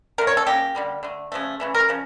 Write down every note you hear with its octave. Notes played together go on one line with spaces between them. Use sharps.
D3 A3 A#4
C#5
A4
C#3 F3 A#3 G4
D3 G3 A#3
D3 A3
C#3 F3 A3
C#3 E3 A3
A#4
C#3 F3